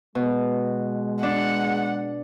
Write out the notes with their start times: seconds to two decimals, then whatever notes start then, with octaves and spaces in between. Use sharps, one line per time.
0.15 B2 G#3
1.23 D4 F#5